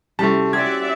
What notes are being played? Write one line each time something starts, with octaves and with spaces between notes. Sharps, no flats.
C3 G3 A3 C#4 E4 F#4 A5
C4 C#4 F#4 G4 D5 E5 F#5 G#6